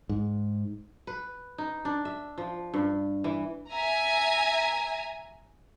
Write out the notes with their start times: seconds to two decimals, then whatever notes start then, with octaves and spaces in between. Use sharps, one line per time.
0.09 G#2
1.07 B4
1.58 D#4
1.85 D4
2.05 E5
2.38 F3
2.74 G2
3.24 E3
3.70 E5 G#5 A#5